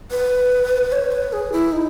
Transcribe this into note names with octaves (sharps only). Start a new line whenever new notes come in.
B4
C#5
B4
G#4
E4
D#4